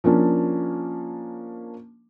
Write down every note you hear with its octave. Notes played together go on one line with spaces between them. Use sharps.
F3 A#3 C#4 D4